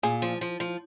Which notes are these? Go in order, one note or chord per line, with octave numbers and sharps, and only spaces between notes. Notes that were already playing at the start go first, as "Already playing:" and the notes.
A#2 G#4
F3
F3
F3